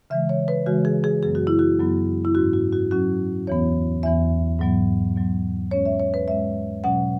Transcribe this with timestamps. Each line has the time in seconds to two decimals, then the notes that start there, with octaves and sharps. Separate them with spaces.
0.10 C#3 E3 G#3 E5
0.29 C#5
0.48 B4
0.66 C#3 E3 G#3 F#4
0.85 G#4
1.04 G#4
1.23 F#2 F#3 B3 G#4
1.35 F#4
1.47 E4
1.59 F#4
1.79 F#2 F#3 B3
2.25 E4
2.35 G#2 F#3 C#4 F#4
2.53 F#4
2.72 F#4
2.91 G#2 F#3 C#4 F#4
3.47 E2 E3 B3 C#5
4.03 E2 E3 B3 E5
4.59 G#2 F#3 B3
5.16 G#2 F#3 B3
5.71 G#2 G#3 C#4 C#5
5.86 E5
6.00 C#5
6.14 B4
6.28 G#2 G#3 C#4 E5
6.84 B2 F#3 C#4 F#5